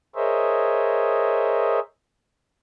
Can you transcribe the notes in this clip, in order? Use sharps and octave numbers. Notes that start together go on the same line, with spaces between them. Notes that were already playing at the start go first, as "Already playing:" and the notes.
G#4 A#4 C5 C#5 D#5 E5